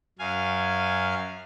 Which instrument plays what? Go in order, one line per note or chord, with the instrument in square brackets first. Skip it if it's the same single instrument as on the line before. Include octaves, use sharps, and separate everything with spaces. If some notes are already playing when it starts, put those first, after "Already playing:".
[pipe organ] F#2 F5 G#5